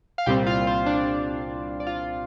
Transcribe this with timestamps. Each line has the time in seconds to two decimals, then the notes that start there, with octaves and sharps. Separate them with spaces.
0.18 F5
0.26 C2 A#2 G3 C4 G4 G5
0.46 F4 F5
0.67 C5
0.86 D4 D5
1.80 D5
1.87 F4 F5